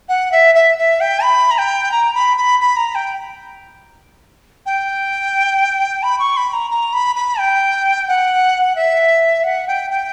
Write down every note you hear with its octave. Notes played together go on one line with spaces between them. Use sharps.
F#5
E5
E5
E5
G5
B5
A#5
G5
A#5
B5
B5
B5
A#5
G5
G5
B5
C#6
B5
A#5
A#5
B5
B5
G5
F#5
E5
F#5
G5
G5